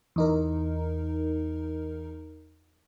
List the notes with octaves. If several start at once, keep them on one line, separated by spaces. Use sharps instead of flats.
E2 D#4 A#4